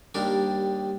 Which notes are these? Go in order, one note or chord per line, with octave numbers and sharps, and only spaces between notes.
D#2 D#3 G3 D4 A#4